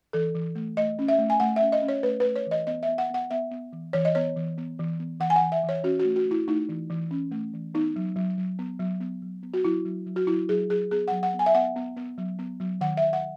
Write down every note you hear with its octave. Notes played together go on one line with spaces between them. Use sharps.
E3 A4
E3
A3
A3 D#5
C#4
E5
A3
G#5
A3 F#5
E5
C#4
D#5
C#4
C#5
A3 B4
B4
A3
C#5
E3 D#5
B3 D#5
E5
B3
F#5
B3 F#5
B3 E5
B3
E3
E3 C#5
D#5
B3 C#5
E3
B3
E3
B3
E3 F#5
G#5
F#5
E3
E5
E3
C#5
C#4 F#4
F#4
A3
F#4
A3
E4
A3 D#4
E3
E3
C#4
A3
E3
B3 D#4
F#3
F#3
F#3
B3
F#3
B3
F#3
B3
F#4
F#3 E4
F#3
F#3
F#4
F#3 E4
F#3 G#4
F#3 G#4
B3 G#4
F#5
F#3
F#5
B3
G#5
E5
B3 F#5
B3
B3
F#3
B3
F#3
D#3 F#5
E5
D#3
F#5